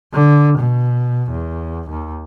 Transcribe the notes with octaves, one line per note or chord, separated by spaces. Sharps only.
D3
B2
E2
D#2